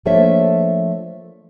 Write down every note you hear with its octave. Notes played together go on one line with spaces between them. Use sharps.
F3 A3 A#3 D4 C#5 E5